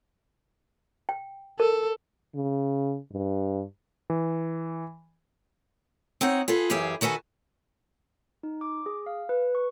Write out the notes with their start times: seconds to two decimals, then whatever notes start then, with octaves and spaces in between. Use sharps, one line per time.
1.09 G5
1.60 A4 A#4
2.35 C#3
3.12 G2
4.10 E3
6.21 C4 D#4 C#5 F#5
6.48 F4 G#4 A4 B4
6.70 F#2 E3 G4 G#4 F5
7.01 D#3 F#4 A4 B4 G#5
8.43 D#4
8.61 D6
8.86 G#4
9.06 F5
9.29 B4
9.55 C#6